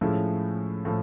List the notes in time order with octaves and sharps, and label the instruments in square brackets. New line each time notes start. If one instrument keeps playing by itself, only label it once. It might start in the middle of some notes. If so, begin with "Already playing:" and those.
[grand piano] A2 F3 G#3 C#4 E4
A2 F3